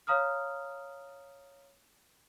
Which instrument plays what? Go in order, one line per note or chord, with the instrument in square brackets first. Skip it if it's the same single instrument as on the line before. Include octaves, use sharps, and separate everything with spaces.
[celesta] C#5 F5 A#5 D#6 F6